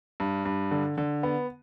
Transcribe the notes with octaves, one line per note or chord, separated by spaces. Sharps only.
G2
G2
D3
D3
B3